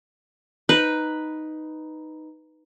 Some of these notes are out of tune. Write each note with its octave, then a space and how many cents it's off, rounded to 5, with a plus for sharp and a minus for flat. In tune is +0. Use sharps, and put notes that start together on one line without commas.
D#4 +0 B4 +0